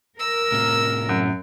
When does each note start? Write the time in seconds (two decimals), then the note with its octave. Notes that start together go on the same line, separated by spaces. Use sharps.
0.19 A#4 E6
0.52 A2 C3
1.09 F#2